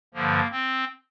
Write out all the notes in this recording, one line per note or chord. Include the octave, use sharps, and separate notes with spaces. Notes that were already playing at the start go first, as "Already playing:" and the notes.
G2 D3 F3 A#3
C4